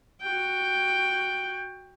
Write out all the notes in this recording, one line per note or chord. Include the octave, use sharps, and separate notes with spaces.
F#4 G5